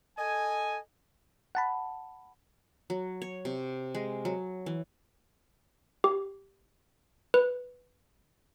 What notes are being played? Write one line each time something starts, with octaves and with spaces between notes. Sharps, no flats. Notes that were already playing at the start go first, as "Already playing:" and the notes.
A4 D#5 G#5
F#5 A5 B5
F#3
C#5
C3
G#3
F#3
E3
G4
B4